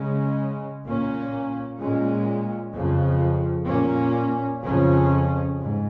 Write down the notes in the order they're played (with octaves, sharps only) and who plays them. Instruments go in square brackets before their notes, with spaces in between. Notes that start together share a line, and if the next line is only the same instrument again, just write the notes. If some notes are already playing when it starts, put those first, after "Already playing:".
Already playing: [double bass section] C#3 G#3 C#4
A#2 A#3 C#4
A#2 G#3 C#4
F2 C#3 F3
A#2 A#3 C#4
F2 C#3 F3 C#4
G#2